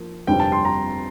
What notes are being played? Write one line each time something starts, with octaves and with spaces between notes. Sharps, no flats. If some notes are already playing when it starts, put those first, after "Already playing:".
Already playing: F3 A#3 F4
G1 F2 C3 G3 C4 G5
A5
C6
A#5